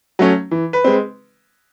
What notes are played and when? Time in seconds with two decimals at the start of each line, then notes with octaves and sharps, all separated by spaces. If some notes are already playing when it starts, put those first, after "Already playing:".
0.19 F#3 A3 C#4
0.51 E3
0.73 B4
0.84 G#3 C4